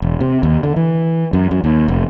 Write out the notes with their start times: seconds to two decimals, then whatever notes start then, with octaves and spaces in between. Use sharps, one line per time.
0.02 E1
0.20 C3
0.43 D#2
0.63 D3
0.76 E3
1.33 F#2
1.51 F#2
1.64 D#2
1.88 F1